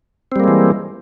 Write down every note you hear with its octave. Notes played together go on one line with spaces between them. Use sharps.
E3 G3 G#3 A#3 C4